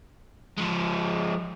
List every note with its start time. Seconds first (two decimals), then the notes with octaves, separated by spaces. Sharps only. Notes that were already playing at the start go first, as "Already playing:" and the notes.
0.58 F3 G#3